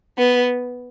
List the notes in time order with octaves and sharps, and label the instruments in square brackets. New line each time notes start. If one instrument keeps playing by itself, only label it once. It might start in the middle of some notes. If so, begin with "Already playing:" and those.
[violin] B3